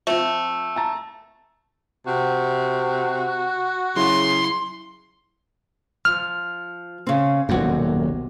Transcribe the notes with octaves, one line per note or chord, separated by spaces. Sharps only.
F3 A3 C4 F4
A5 A#5 A6
C3 F#4
C#3 F#3 E4 C6
F3 F6
C#3 C4
D#1 B1 F#2 C3 F#4